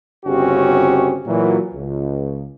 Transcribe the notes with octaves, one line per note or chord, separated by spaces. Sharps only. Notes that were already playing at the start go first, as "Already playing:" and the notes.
G1 C#3 C4 C#4 F#4 G4
A#2 E3 F#3
C#2